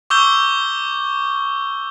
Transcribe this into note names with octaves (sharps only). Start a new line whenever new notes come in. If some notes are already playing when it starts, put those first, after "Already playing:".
C#6 D6 E6 G6 G7